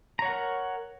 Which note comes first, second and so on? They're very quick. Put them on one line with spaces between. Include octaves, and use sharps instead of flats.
A#5 C#5 F#5 A#4